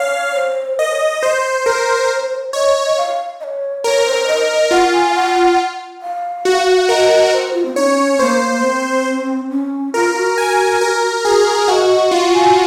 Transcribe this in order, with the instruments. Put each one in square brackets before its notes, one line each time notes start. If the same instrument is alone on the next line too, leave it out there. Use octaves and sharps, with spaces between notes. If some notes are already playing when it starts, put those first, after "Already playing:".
Already playing: [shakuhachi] C#5 [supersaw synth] F5
[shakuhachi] C5
[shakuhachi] A#4 [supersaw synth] D#5
[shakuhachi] C#5
D#5
[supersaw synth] C5
[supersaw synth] A#4 [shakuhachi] C5
[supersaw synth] C#5 [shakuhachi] D#5
[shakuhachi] F5
D#5
C#5
[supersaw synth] A#4 [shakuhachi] C#5
[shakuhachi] C5
D#5
[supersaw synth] F4 [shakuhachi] F#5
[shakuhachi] G#5
F5
F#5
F5
[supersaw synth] F#4
[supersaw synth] A#4 [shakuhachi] D#5 F5
[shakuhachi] C5
F4
C4
[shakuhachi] C#4 D#4 [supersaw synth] C#5
[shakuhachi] A#3 [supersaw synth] C5
[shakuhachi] C4
C#4
[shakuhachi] F4 [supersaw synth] A#4
[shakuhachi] F#4
[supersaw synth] G#5
A#4
[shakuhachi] F#4 [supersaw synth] G#4
[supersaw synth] F#4 [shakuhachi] D#5 F5
[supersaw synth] F4 [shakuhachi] F5
[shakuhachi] G#5